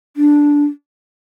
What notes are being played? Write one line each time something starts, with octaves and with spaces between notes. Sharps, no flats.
D4